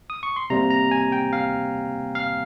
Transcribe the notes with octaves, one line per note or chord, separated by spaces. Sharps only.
D#6
C#6
C6
C3 G3 A#3 A#5
A#5
G#5
G5
F5
F5